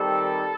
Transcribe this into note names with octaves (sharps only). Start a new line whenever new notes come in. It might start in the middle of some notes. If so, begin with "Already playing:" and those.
Already playing: D#3 G3 C4 A4